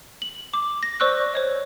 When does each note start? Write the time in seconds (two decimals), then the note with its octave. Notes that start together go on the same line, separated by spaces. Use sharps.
0.22 F#7
0.53 D6
0.83 A#6
1.00 C5 D5 C#6 E6 F#6
1.34 C5 C#5 D#5